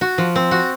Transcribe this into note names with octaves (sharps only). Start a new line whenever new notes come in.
F#4
F3
C4
F#4